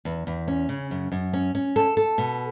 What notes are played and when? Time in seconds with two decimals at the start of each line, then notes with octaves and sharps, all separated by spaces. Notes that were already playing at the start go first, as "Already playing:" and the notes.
0.05 E2
0.27 E2
0.48 C#4
0.69 C#3
0.91 F#2
1.12 F#2
1.33 C#4
1.55 C#4
1.76 A4
1.97 A4
2.18 B2